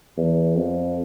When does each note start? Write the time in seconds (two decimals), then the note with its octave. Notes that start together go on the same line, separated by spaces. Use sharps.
0.17 E2
0.56 F2